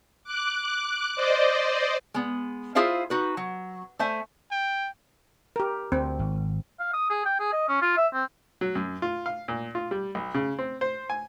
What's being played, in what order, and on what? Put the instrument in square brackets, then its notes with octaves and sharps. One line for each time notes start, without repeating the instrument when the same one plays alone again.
[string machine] D6 F#6
C5 D5 D#5
[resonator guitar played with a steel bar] G#3 B3
E4 F4 G#4 C5 E5 F5
D#4 F#4 B4
F#3
A3 C5 E5 G#5
[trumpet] G5
[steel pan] G4 A#4
[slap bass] D2 [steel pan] C4
[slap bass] G#1
[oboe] F5
D#6
G#4
G5
G#4
D#5
C#4
F4
E5
C4
[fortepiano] F#3
F#2
F4
F5
A#2
F4
G3
B1
C#3
C4
C5
G#5